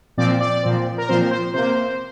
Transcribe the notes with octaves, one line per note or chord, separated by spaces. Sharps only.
A#2 F3 C4 D5
D5
A#2 F3 C4
A#4
A#2 F3 C4 C5
C5
C3 A#3 C5